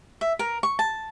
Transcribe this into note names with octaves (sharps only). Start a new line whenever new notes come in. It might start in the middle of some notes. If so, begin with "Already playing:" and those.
E5
A#4
C#6
A5